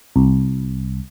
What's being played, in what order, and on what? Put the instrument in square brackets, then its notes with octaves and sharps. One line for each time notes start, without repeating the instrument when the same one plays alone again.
[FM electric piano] C2